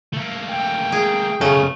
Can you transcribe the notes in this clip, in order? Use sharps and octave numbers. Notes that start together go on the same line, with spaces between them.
A3 A#3
G5
G#4
F#2 C#3 A3 B3